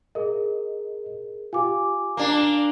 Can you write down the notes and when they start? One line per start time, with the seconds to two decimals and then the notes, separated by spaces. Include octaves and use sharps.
0.15 G#4 A#4 D#5
1.53 F4 G4 G#5 D6
2.17 A#3 D4